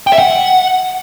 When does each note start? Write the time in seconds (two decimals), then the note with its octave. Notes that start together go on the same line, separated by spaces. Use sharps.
0.07 G5
0.13 E5
0.19 F#5